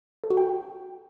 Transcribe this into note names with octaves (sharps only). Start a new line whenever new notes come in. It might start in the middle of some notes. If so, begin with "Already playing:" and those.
A4
F#4
G5